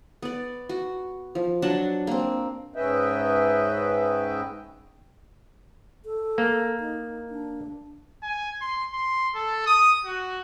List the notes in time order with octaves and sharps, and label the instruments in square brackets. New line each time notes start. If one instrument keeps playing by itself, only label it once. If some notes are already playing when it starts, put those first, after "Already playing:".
[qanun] B3 D5
F#4
F3
F#3 D4 F#5 A5
A#3 C4
[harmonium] G#2 C#4 B4 D#5 E5 G5
[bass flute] A4
[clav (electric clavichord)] A#3
[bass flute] D#4
D4
[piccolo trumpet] G#5
C6
C6
A4
D#6
F#4